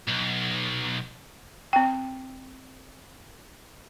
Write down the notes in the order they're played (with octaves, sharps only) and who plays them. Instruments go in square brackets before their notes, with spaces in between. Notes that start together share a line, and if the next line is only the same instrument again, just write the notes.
[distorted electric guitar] B1
[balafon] C4 G5